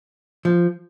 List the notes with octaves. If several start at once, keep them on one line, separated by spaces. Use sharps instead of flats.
F3